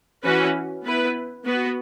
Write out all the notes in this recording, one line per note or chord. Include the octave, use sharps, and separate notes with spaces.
E3 C#4 F#4 B4
B3 E4 B4
B3 F#4 B4